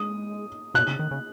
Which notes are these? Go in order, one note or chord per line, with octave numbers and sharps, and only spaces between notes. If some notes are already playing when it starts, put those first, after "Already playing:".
Already playing: G#3 D#6
B2 F#6
C#3
D#3
C#3